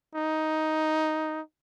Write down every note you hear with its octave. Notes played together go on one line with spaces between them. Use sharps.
D#4